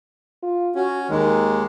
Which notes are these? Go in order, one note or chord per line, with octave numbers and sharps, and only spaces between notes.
F4
C#4 F#4
D#2 D#3 G#3